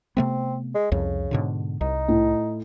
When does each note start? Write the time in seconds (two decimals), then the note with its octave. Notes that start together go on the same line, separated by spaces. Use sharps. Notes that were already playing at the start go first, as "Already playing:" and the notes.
0.17 C3 A3 B3 C4
0.75 G#3
0.92 C2 F2 C#3
1.31 G#2 B2 D3
1.81 C2 D#4
2.09 A2